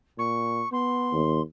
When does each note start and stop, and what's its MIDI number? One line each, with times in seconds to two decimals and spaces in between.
0.18 0.64 46
0.18 0.68 85
0.72 1.25 59
0.72 1.41 84
1.12 1.40 39